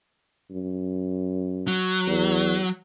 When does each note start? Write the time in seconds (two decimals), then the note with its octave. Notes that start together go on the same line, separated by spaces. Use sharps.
0.51 F#2
1.68 F#3
2.07 E2